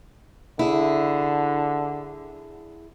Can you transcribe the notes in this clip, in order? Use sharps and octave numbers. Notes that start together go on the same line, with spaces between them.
D3 E4 G#4